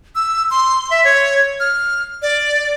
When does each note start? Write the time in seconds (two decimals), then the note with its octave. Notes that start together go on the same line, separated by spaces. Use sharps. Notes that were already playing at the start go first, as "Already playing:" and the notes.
0.15 E6
0.51 C6
0.91 E5
1.05 C#5
1.60 F6
2.22 D5